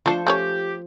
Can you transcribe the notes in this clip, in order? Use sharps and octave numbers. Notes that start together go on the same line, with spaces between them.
F3 A3 D4 A4 C5
A3 C#4 G4 C#5